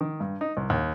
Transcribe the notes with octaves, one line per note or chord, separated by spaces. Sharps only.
D#3
G2
D#4
C2
D#2